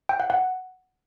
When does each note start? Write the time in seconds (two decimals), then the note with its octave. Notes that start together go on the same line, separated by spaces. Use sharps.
0.09 G5
0.20 F#5
0.30 F#5